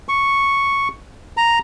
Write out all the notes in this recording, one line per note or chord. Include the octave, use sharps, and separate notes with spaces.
C#6
A#5